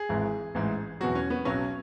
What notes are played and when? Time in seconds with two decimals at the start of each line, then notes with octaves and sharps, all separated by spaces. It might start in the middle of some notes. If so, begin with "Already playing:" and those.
Already playing: G#4
0.09 G#1 G#2 E3
0.55 A1 G#2 E3
1.00 E2 B2 F#3 F#4
1.15 C#4
1.30 B3
1.45 B1 B2 F#3 C#4